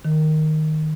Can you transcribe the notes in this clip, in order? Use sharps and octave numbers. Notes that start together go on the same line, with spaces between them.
D#3